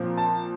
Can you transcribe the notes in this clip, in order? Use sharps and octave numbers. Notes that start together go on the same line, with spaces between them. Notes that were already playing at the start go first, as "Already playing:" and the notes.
Already playing: A#2 F3 C4
A5